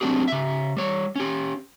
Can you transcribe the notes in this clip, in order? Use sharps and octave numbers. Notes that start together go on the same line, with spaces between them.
F#3 C4 D4 G4 G#4
C#3 E5
G3 C#5
C#4 G4